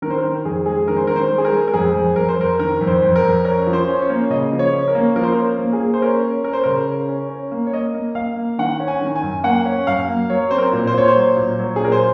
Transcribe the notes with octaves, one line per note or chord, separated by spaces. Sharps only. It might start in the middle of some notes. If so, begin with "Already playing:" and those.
D#3 A#4
C5
A#4
D#3
F2 G#4
G#3 G#4
D#3 A#4
C5
D#3 A#4
C5
G#3
G#4
A#4
G#3
A#4
F2 G#4
F2
F2 A#4
C5
F2 A#4
D#3 A#4
F2
C5
F2
A#4
F2
C#4 A#4
F3
C5
C#4
C#5
A#3
C#3 D#5
F3
C#5
C#4
A#4
A#3
F3 A#4
C5
A#4
C#4
A#3
G#4
A#3
C5
C#4 A#4
C#4
C#4 A#4
C5
C#3 A#4
C#4
C#4
C#4
A#3
C#5
A#3 D#5
A#3
A#3 F5
A#3
D#3 F#5
C#4
G#5
D#3
G#5
F#2
A#3 F#5
C#4
F#2 F5
A#3
F#3 C#5
C4 C5
A#4
A#2
C5
A#2 C#5
C5
F#3
A#2
F#3
G#4
A#2 A#4
C5